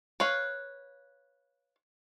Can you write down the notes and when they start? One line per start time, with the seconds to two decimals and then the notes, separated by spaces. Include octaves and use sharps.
0.20 B4 C#5 F5